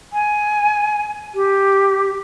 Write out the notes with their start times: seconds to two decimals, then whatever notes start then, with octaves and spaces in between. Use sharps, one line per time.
0.13 G#5
1.35 G4